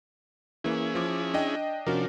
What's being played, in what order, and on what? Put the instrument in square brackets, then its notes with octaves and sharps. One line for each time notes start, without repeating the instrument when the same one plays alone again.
[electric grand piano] E3 A#3 [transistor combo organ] C#4 E4 G#4
[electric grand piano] F3 D6
D4 D#5 G5
[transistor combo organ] C3 F3 D4 [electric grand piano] C#4 F#4 A#4